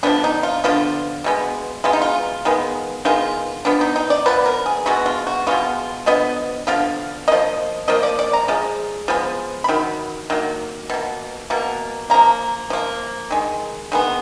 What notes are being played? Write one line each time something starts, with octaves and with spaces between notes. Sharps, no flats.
D3 F3 B3 D4
D#4
F4
D3 F3 B3 F4
B2 G#3 B3
B2 G#3 B3 F4
D#4
F4
D#3 G#3 B3
D#3 G#3 B3 F4
F3 B3 D4
D#4
D#4
D5
F3 B3 B4
A#4
G#4
B2 G#3 B3 F#4
F4
F#4
B2 G#3 B3 F4
D3 F3 B3 D#5
D3 F3 B3 F5
F3 A#3 D#5
F3 A#3 D#5
D5
D5
A#5
F3 G#3
F3 G#3 B3
B5
D#3 F#3
D#3 F#3 A#3
B2 A#3
B2 A#3
F3 A#3 A#5
F3 A#3
D#3 G#3
D#3 G#3 B3